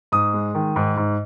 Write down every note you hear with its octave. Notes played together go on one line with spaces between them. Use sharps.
G#2 D#6
G#3
D#3
G#2
G#2